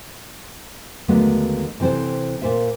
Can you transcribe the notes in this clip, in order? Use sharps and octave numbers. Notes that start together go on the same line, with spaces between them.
D#2 D3 F#3 G#3 A3 B3
C3 E3 C4 A4 C5
A#2 C5 E5